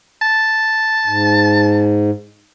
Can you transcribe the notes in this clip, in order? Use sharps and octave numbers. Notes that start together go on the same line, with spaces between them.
A5
G#2